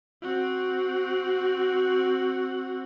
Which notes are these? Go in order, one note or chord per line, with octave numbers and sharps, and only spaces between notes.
C4 F#4